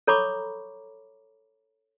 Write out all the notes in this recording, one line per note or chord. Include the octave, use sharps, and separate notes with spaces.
A4 C#5 A#5 B5 C#6 D6